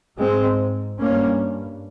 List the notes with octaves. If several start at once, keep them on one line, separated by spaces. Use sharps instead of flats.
G#2 G#3 C4
G2 A#3 C#4